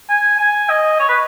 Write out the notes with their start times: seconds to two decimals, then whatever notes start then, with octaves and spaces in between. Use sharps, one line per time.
0.09 G#5
0.39 G#5
0.70 D#5
1.00 C#5
1.09 B4